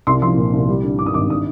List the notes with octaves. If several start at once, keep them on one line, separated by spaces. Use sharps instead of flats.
C2 C6
F3 C6
A#2
C2
G3
D3
G2 D6
D#6
G#1 D6
D4 D#6